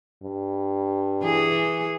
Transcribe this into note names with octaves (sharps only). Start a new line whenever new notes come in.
G2
E3 G#4